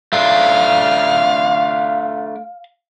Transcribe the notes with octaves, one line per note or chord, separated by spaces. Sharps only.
A3 D4 F4 F5